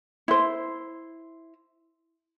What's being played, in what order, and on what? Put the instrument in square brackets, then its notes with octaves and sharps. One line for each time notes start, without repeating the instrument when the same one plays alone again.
[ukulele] E4 C5